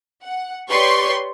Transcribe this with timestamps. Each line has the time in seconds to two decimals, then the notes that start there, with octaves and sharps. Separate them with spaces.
0.23 F#5
0.69 G4 B4 C#5 D5 C6 C#6